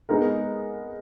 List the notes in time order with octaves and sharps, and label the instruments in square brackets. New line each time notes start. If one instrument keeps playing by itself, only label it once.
[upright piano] G#3 B3 D#4 A#4